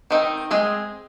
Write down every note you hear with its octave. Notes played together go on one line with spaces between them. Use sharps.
D#3 C4 D#4
G#3 C4 G#4